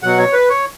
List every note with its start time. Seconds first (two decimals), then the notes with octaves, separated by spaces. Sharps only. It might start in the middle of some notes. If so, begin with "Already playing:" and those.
0.03 B2 F#3 F#5
0.18 C#5
0.33 B4
0.49 C#5